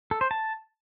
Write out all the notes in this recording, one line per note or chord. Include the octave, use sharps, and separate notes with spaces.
A4
C5
A5